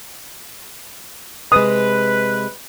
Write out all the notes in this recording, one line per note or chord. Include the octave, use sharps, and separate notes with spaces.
C3 G#3 B4 D#6